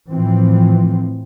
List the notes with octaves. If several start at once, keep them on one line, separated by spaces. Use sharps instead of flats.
A2 E3 F3 C4